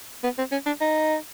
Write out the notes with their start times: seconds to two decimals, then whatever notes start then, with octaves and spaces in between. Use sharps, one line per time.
0.24 B3
0.38 C4
0.52 C#4
0.66 D4
0.81 D#4